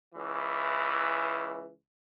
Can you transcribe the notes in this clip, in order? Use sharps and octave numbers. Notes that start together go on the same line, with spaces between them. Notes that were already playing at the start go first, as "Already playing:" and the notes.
C#2 E3